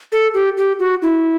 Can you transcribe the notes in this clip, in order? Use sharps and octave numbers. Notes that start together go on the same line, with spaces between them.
A4
G4
G4
F#4
E4